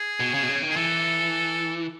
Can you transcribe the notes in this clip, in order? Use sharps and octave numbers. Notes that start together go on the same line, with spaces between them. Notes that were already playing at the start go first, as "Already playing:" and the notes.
Already playing: G#4
B2
C#3
B2
C#3
D#3
G#4
E3 A4